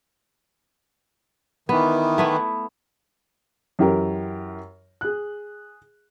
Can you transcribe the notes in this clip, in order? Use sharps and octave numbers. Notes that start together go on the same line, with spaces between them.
D#3 E3 B3
A3 B3 E4
F#2 E3 G4 A#4
G#4 F#6